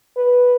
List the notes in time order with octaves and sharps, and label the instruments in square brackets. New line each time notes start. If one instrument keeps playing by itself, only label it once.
[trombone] B4